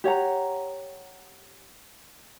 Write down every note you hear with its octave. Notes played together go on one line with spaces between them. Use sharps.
G4 C#5 F#5 A#5